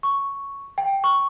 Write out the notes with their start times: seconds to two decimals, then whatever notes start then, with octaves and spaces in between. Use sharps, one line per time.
0.03 C#6
0.78 G5
1.04 C#6